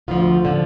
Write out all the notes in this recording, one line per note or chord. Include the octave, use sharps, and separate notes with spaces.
D2 D3 F3 F4
D3 F3